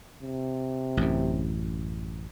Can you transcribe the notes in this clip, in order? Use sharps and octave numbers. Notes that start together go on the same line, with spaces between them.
C3
A1 F#2